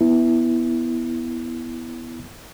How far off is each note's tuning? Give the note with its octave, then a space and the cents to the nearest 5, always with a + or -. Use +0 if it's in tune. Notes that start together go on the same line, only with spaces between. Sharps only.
B3 +0 E4 +0